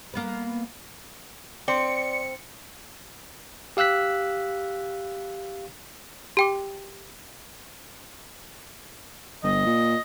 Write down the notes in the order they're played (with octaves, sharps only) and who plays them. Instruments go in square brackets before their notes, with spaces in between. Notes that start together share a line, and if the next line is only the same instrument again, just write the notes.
[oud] A#3 B3 B4
[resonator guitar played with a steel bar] C4 [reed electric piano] D5 C6 [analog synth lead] C#7
[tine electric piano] G4 F5 E6 F#6 B6
[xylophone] G4 G5 D6
[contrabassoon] G1 [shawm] D#5
[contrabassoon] A#2